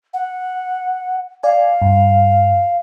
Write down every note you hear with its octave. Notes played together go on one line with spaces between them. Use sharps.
F#5
D5 F5 G#5
G2